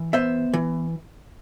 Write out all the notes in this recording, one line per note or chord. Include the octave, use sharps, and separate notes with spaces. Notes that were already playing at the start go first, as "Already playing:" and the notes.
Already playing: E3
B3 C5 E5
E3